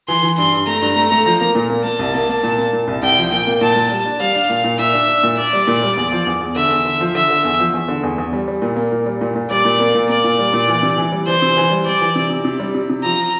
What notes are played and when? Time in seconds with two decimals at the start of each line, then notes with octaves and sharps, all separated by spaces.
0.08 E3 C6
0.23 E3
0.37 G2 C6
0.52 G2
0.67 A3 A#5
0.82 G2
0.96 A3
1.11 A3
1.26 F3
1.41 A#3
1.55 A#2
1.70 A#3
1.84 A#3 A5
1.99 C2
2.14 A#3
2.29 A#3
2.43 A#2
2.58 A#3
2.73 A#2
2.88 C2
3.03 C2 G5
3.18 F3
3.32 A#2 G5
3.47 A#3
3.61 A#2 A5
3.76 A#2
3.91 G3
4.06 D4
4.20 G3 F5
4.35 D4
4.50 A#2
4.64 A#2
4.79 A#2 E5
4.94 D4
5.08 D4
5.24 A#2
5.38 D4 D5
5.53 G3
5.68 A#2
5.83 G3
5.97 E2
6.12 F3
6.27 E2
6.41 E2
6.56 D3 E5
6.71 E2
6.85 D3
7.00 F3
7.15 D3 E5
7.30 D3
7.45 E2
7.59 F3
7.74 E2
7.88 D3
8.03 E2
8.18 E2
8.33 G3
8.48 G3
8.62 A#2
8.76 A#3
8.92 A#2
9.06 G3
9.21 A#2
9.36 A#2
9.50 G3 D5
9.65 A#2
9.80 A#3
9.95 A#2
10.09 A#3 D5
10.24 A#2
10.39 G3
10.54 A#2
10.68 E3
10.83 C3
10.98 E3
11.12 G3
11.27 E3 C5
11.42 C3
11.57 E3
11.71 G3
11.86 G3 D5
12.01 E3
12.16 C3
12.30 C3
12.45 C3
12.60 G3
12.75 C3
12.90 C3
13.04 F3 A#5